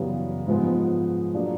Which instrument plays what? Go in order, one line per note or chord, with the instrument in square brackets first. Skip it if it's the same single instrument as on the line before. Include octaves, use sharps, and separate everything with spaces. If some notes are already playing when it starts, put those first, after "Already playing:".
Already playing: [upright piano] F#2 C#3 E3 G3 B3
G#2 F3 G#3 B3
A#2 F#3 A#3 D4